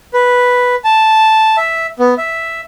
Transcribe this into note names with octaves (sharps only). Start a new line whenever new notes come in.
B4
A5
E5
B3
E5